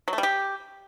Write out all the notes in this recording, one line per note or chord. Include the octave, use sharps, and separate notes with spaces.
F#3
A3
G3
G4